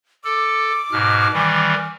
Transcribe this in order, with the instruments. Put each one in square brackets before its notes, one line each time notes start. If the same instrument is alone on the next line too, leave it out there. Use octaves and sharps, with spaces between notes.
[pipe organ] A4 [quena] D6
[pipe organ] G#2 B2 F6
D#3 E3 G3